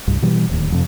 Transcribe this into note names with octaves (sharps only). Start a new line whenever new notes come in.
C2 G2
B2 E3 G3
D1 D#2
F2 C3